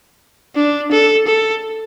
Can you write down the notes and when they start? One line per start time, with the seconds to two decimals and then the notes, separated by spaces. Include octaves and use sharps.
0.56 D4
0.91 A4
1.27 A4